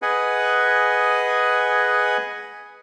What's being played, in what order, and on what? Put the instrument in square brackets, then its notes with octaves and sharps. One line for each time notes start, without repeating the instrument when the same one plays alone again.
[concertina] G#4 B4 D#5 F#5 G#5